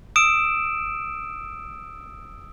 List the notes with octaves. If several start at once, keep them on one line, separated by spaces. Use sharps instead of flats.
D#6 E6 D7 E7